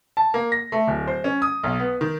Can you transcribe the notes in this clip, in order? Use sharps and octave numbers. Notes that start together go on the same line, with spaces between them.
A5
A#3
A#6
A3
D1
C5
C#4
D#6
B1
B3
D#3